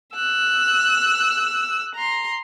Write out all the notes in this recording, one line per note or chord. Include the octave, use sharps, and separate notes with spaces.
E6 F#6
A#5 C6